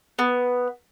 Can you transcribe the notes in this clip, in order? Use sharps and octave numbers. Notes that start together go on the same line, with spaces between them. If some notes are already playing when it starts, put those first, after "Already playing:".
B3